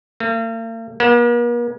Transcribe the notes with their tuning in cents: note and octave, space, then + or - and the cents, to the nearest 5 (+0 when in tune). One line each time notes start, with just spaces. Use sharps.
A#3 -45
A#3 +45